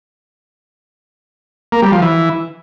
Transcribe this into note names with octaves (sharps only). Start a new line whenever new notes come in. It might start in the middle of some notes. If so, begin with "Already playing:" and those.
A#3
G3
F3
E3